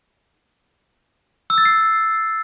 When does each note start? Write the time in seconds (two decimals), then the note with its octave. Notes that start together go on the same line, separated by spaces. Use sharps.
1.50 E6
1.58 A6
1.65 C7